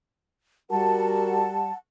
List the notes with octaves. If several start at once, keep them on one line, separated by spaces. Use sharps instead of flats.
G3 F#4 A#4 F#5 A5